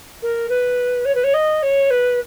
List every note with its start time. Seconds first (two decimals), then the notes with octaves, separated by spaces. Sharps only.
0.22 A#4
0.49 B4
1.05 C#5
1.14 B4
1.23 C#5
1.33 D#5
1.62 C#5
1.90 B4